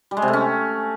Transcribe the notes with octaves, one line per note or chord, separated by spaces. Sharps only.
G3
G#3
C3
A3
C#4